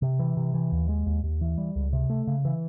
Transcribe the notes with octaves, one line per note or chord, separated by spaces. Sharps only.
C3
E3
C3
E3
D#2
G#3
D#2
D#2
E3
G3
C#2
C3
A3
C#3
E3